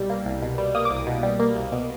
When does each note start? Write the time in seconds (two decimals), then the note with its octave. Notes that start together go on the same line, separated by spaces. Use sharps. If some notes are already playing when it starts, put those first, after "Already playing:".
Already playing: C2 B2 G3 E6
0.10 A#3
0.25 C2
0.42 B2
0.58 G3
0.75 A#3 D#6
0.85 D6
0.91 C2
0.97 D#6
1.07 B2
1.23 G3
1.39 A#3
1.55 C2
1.72 B2